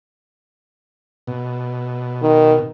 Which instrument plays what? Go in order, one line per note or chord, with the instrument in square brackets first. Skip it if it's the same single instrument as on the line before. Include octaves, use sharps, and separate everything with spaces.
[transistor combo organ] B2
[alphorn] D#3